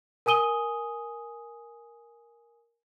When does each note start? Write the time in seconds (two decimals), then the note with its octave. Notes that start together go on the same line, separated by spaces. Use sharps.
0.26 A#4 G#5 D#6 D#7 G7